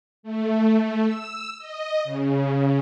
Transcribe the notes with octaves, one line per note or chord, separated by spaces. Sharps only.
A3
E6
D#5
C#3